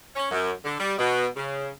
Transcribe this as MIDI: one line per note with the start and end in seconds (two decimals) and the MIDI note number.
0.16 0.28 61
0.31 0.51 42
0.64 0.76 50
0.80 0.93 55
0.98 1.26 47
1.36 1.69 49